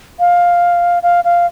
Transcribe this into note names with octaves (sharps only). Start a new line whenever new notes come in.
F5
F5
F5